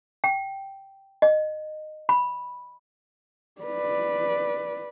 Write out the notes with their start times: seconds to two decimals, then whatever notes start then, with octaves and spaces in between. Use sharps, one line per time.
0.24 G5
1.22 D#5
2.09 B5
3.61 B4 D5